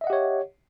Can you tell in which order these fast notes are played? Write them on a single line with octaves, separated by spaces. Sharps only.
E5 D#5 F#5 G4 C#5